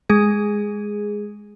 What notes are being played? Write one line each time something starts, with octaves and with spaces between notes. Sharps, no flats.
G#3 G#4